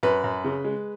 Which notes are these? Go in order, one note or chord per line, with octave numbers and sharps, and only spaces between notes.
F#2 B4
F#2
C#3
G#3